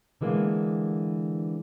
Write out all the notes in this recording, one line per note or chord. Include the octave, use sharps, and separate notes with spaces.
D3 E3 G#3 A#3 B3